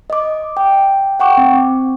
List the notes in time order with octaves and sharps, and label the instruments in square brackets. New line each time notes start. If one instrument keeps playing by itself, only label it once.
[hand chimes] D#5 D6
G5
F#5 G5 C#6 D6
C4